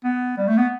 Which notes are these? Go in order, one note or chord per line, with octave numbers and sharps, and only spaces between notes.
B3
G3
A3
B3